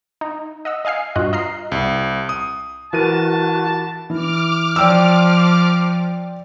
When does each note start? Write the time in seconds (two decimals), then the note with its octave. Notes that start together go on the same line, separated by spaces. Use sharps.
0.21 D#4
0.65 D#5 F#5 E6
0.85 D#5 F5 G#5 F6 C7
1.16 G2 F4 F#4 D#5 F#6
1.32 F4 D#5 A#5 F6 C7
1.72 C2
2.29 D#6
2.93 E3 F#4 A#4 A5 D#7
4.10 E3 D6 F6
4.76 F3 D5 G5 E6